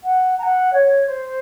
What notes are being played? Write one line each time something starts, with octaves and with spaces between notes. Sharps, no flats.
F#5
A#5
F#5
C#5
C5